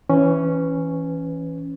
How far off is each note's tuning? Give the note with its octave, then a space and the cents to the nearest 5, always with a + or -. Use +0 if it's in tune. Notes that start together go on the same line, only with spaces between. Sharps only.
E3 +0 C#4 +0 B4 +20